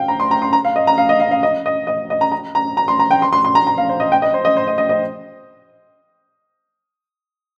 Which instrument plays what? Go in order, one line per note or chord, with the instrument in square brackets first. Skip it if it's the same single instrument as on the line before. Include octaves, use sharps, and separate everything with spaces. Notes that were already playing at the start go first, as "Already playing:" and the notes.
Already playing: [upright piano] F5 G5
A#5
C6
A#5
C6
A#5
F5
D#5
A#5
F5
D#5
F5
F5
D#5
D#5
D#5
D#5
A#5
A#5
A#5
A#5
C6
A#5
G5
C6
C6
C6
A#5
A#5
F5
C5
D#5
G5
D#5
C5
D#5
C5
D#5
D#5
D#5